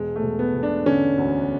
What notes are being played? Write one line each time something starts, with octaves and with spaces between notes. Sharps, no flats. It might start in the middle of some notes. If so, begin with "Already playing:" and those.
Already playing: E1 G#3
A3
E1
B3
E1
D4
D3 C#4
D2